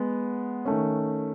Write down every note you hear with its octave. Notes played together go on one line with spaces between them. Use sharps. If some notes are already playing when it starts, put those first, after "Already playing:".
Already playing: G#3 B3
D#3 A3 C#4